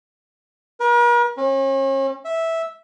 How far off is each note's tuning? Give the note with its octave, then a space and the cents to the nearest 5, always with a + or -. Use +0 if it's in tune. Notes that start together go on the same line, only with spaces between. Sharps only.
A#4 +45
C#4 -40
E5 -10